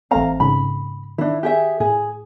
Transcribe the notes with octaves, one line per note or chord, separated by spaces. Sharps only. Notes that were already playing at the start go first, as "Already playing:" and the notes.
A1 A3 C4 F5 A#5
G#2 C#3 B5
D#3 D4 E4
G4 G#4 E5
A2 G#4